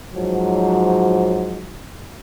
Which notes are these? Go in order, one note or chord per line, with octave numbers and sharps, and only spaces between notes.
G#2 F3 F#3